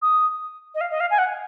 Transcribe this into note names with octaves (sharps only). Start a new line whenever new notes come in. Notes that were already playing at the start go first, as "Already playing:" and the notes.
D#6
D#5
F5
D#5
F5
G#5
F#5